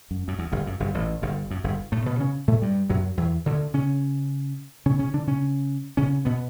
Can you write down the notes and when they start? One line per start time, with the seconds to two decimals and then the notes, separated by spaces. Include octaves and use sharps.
0.11 F#2
0.28 F#2
0.39 E2
0.52 G1 G2
0.67 F#2
0.80 G1 G2
0.94 A1 A2
1.22 G1 G2
1.51 F#2
1.64 G1 G2
1.92 A2 A3
2.06 B2 B3
2.20 C#3 C#4
2.48 A2 A3
2.62 G2 G3
2.90 F#2 F#3
3.17 E2 E3
3.46 D2 D3
3.74 C#3 C#4
4.86 C#3 C#4
4.99 C#3 C#4
5.14 D3 D4
5.27 C#3 C#4
5.97 C#3 C#4
6.25 B2 B3